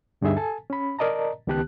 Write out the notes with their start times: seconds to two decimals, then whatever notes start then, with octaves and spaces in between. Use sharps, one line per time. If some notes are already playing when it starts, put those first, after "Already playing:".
0.21 D2 G2 D3 D#4 G#4 E5
0.36 A4 G#5 A5
0.70 C#4 B5
0.99 A#4 D5 D#5 A5 A#5
1.47 C#2 D#3 B3 G4 A5 F#6